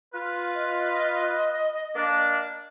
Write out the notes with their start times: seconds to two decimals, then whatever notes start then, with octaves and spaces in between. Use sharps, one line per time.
0.14 F4 B4
0.55 D#5
1.96 A#3 D4